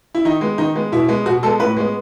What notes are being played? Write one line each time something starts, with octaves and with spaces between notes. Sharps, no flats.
E4
D#3 D#4
G#3 B3
D#3 D#4
G#3 B3
B2 E4
G#3 B3
B2 F#4
G#3 B3 A4
A2 B4
G#3 B3